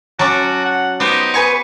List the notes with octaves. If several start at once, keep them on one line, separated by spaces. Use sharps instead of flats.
F#3 C#4 F#4 A5 D6
F#5
B3 D#4 G4 C5
B4 G#5 C#6